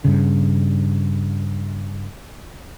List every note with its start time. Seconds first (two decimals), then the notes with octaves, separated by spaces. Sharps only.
0.05 G2 C#3